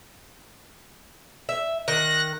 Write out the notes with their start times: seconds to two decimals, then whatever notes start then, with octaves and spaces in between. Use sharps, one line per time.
1.49 E5
1.88 D#3 F#6 A#6